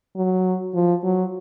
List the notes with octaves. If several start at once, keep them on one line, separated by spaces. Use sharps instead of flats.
F#3
F3
F#3